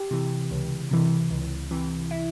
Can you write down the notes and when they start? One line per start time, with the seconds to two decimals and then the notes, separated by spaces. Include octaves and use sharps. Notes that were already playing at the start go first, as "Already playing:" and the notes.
Already playing: G4
0.11 C3 E3
0.51 C#2
0.91 C3 E3
1.31 C#2
1.71 C3 E3
2.11 E4